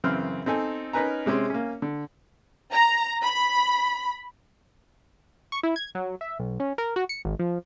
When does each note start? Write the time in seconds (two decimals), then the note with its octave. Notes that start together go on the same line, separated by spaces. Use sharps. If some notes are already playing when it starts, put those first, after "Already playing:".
0.04 F#2 C#3 E3 C4 C6 F6
0.46 C4 D#4 A4 G#5
0.93 C#4 D#4 A#4 B4 G#5 A#5
1.26 C3 G#3 C4 C#4
1.50 A#3 C#4
1.82 D3
2.72 A#5
3.23 B5
5.52 C#6
5.63 E4
5.76 G#6
5.95 F#3
6.21 E5
6.39 B1
6.60 C#4
6.78 A#4
6.96 F#4
7.09 C#7
7.25 G#1
7.39 F3